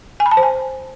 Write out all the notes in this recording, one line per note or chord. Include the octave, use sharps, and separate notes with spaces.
G#5
B5
A5
C5
G#5